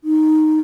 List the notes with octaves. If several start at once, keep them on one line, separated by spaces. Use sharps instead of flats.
D#4